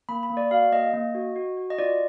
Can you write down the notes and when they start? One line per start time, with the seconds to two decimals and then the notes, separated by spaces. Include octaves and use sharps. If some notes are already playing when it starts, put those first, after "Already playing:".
0.09 A#3 B5
0.23 B5
0.30 A#3
0.37 D5
0.51 F#4 F5
0.72 A#3 D#5
0.94 A#3
1.15 F#4
1.36 F#4
1.57 F#4
1.70 D#5
1.79 F4 D5